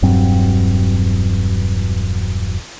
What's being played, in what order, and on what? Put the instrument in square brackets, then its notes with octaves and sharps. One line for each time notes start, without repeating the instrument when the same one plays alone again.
[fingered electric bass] E1 G2 F#3 C4